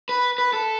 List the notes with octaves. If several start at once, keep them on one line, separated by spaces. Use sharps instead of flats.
B4
B4
A4